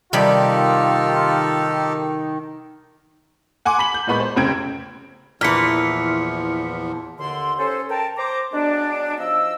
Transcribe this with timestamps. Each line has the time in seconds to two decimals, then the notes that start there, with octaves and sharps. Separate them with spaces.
0.13 C3 D#3 G3 D#4 F4 G4 A4 B5
3.65 F#5 G#5 C6 D6
3.79 B5 B6 F#7
3.94 G6
4.07 A#2 G#3 B3 B5 C#6
4.20 C5
4.36 F1 C#3 C4 G5 G#6 D7
5.41 E2 A#2 E3 F3 F6 B6 C#7
7.18 D#2 D3 C6
7.58 C#4 A4 C5
7.90 A#4 G5 A5
8.18 C5 A#5 D6
8.52 F#3 G#3 B3 D4
9.18 F3 D#4 D#5 E6